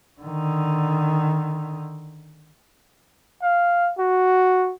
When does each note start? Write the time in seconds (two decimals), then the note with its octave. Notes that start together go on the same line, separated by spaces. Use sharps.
0.21 D3 D#3
3.42 F5
3.98 F#4